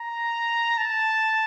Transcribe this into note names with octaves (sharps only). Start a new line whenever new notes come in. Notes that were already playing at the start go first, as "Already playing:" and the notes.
Already playing: A#5
A5